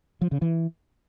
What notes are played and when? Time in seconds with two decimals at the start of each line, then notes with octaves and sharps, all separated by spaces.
0.21 F3
0.32 C#3
0.42 E3